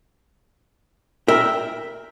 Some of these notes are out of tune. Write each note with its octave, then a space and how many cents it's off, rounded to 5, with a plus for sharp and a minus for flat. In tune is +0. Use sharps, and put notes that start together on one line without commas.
A#4 +0 E5 +0 G5 +0